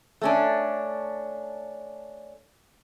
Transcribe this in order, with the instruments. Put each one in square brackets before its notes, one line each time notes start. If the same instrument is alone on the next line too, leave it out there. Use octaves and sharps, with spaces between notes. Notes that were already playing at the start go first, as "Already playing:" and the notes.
[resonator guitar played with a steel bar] A3 C#4 D4